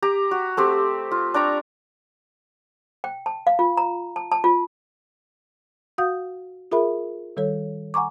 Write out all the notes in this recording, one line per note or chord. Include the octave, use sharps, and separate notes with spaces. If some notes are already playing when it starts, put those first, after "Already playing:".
G4 A#5
F#4
A3 C4 G4
F4
D4 G5 A#5 C#6
G5
A5
F5
F4
A#5
A5
A5
F4
F#4 F5 F#5 D#6 G6
F4 G#4 A#4 E5 B5
D#3 G3 A4 C#5
F#5 G#5 A#5 C#6 D6